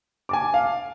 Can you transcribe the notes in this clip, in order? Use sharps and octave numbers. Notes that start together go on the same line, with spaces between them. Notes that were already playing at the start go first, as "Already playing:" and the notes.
G#5 A5 D6
F5